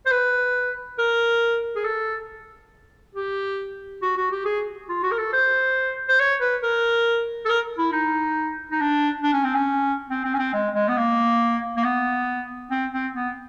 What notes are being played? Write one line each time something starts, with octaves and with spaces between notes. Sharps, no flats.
C5
B4
A#4
G#4
A4
G4
F#4
F#4
G4
G#4
F4
F#4
A#4
A4
C5
C5
C#5
B4
A#4
A4
A#4
E4
D#4
D#4
D4
D4
C#4
C4
C#4
C4
C4
C#4
C4
G#3
G#3
B3
A#3
A#3
B3
C4
C4
B3